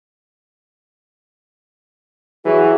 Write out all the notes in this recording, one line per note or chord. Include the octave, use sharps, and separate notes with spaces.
E3 F#3 E4 F#4 G#4